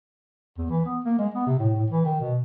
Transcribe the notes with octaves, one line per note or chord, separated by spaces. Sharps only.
E2
E3
B3
A#3
G#3
B3
C3
A2
A2
E3
D#3
B2